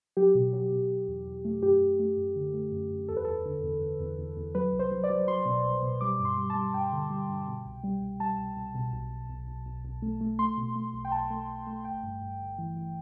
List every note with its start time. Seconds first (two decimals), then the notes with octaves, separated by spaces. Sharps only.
0.17 F#3 G4
0.35 B2
0.53 F#3
0.71 B2
0.90 B2
1.08 E2
1.26 E2
1.45 A3
1.62 F#2 G4
1.81 F#2
1.99 A3
2.17 F#2
2.36 D3
2.54 A3
2.72 F#2
2.90 F#2
3.08 E2 A4
3.17 B4
3.25 E2 A4
3.45 D3
3.63 E2
3.81 E2
4.00 E2
4.18 E2
4.37 E2
4.55 F#3 B4
4.73 C2
4.79 C5
4.91 F#3
5.04 D5
5.10 F#3
5.28 F#3 C6
5.45 B2
5.65 C2
5.82 B2
6.01 G3 D6
6.19 G2
6.25 C6
6.38 G3
6.50 A5
6.55 G3
6.74 G2 G5
6.92 D3
7.10 G3
7.28 G2
7.47 B2
7.65 C2
7.84 G3
8.02 C2
8.20 G3 A5
8.38 C2
8.56 C2
8.75 B2
8.93 B1
9.11 B1
9.29 B1
9.47 B1
9.66 B1
9.85 B1
10.02 A3
10.21 A3
10.39 A3 C6
10.57 B2
10.76 A3
10.94 B1
11.05 G5
11.12 B1 A5
11.30 A3
11.49 B1
11.67 A3
11.85 G1 G5
12.03 G2
12.21 G2
12.40 G1
12.58 E3
12.76 E3